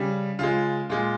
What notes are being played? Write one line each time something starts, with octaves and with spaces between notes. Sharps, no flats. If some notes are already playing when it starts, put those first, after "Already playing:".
Already playing: C#3 G3
C#3 G#3 F4
A#2 G#3 F4